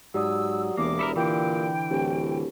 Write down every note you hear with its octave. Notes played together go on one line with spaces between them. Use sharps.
G#2 F#3 G4 D5 D#6 E6
E1 E2 A#3 D6
E4 A4 A#4
A#2 D3 E3 G5
D1 G4